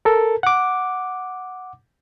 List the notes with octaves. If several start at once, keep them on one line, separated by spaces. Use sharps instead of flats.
A4 A#4
F#5 D6